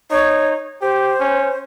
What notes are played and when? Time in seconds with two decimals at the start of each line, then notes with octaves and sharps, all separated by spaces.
0.11 D#4 C#5
0.82 G4 C5
1.20 C#4